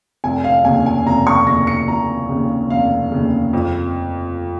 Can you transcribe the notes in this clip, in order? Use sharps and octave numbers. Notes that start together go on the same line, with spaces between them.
F1 G#5
F5
D#2 C#3 G#5
G#5
F1 A#5
C#6
D#2 C#3 A#6
C#7
F1 A#5
D#2 C#3
F1 F5
D#2 C#3
F2